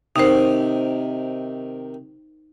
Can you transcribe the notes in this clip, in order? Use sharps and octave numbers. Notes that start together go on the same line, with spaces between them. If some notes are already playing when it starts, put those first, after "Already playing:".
C3 D#3 D#4 C5